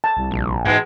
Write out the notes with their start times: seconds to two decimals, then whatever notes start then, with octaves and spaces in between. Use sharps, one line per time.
0.04 A5
0.17 C2
0.31 A#1
0.65 G#2 B2 E3 G#3